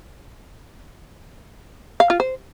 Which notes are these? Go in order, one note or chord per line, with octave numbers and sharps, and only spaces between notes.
F5
F4
C5